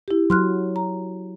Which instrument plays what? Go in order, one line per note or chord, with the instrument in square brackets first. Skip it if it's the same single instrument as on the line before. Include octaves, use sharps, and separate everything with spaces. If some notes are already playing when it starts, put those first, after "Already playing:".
[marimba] E4 G4
[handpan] F#3 [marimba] C6 F6 F#6
[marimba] A#5